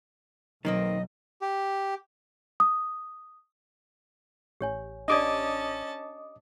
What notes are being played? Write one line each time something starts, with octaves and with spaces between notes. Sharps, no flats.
B1 D#3 F#3 A#3 C4 D#5
G4
D#6
A1 G4 C#5 G#5
C#4 D4 G4 D5 D#5 A5 D6 D#6